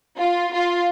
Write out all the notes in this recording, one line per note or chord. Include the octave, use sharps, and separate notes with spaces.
F4
F4